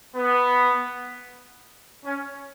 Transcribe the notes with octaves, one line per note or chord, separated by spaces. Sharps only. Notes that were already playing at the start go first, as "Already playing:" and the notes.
B3
C#4